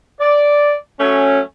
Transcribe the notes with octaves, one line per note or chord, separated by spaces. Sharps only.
D5
F#3 A3 C#4